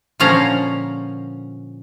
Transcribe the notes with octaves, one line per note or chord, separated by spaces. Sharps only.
A#2 D3 F3 C#4 F5 A#5